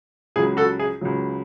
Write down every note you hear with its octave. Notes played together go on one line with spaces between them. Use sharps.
C#2 C#3 F#3 G#4
F#4 A4
G#4
C#2 C#3 F#3